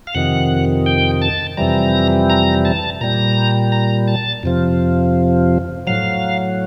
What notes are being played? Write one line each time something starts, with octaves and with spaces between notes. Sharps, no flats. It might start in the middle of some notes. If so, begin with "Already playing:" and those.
F5
F2 C3 D#3 F#5
G5
A5
F2 C3 E3 G3 A#5
A#5
A5
A#2 G3 A#5
A#5
A5
F2 C3 F3
A2 F#3 F5